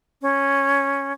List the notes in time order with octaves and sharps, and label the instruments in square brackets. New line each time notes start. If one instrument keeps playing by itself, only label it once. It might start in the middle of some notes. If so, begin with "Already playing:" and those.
[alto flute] C#4